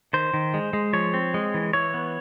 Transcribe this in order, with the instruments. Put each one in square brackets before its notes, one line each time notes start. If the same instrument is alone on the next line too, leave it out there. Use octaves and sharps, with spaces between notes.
[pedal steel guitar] D#3 C5
D#3
G#3
G#3
F3 C#5
C4
G#3
E3
E3 C#5
B3